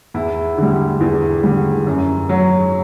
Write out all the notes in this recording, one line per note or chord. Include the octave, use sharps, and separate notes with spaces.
E2 E4
D3 G3
E2
D3 G3
F#2
F#3